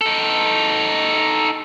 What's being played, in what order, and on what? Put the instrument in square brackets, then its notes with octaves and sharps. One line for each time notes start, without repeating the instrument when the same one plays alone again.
[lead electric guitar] D#4 A4